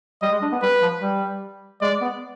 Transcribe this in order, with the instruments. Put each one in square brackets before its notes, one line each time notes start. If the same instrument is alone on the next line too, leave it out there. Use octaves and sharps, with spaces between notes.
[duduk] G3 [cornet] D#5
[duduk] G#3
D4
B3
[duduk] G3 [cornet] B4
[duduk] F3
G3
[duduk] G#3 [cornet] D5
[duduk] B3